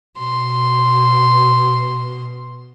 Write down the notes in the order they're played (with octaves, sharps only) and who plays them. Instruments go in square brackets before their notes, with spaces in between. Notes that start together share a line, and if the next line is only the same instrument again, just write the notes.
[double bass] B2 [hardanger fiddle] C6